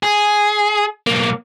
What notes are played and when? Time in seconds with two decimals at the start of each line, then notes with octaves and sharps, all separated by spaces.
0.03 G#4
1.07 B1 A#3